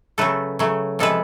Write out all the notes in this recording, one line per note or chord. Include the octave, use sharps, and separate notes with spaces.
C#3 F#3 A3 A4 B4
C#3 F#3 A3
C3 F3 G#3 A4 B4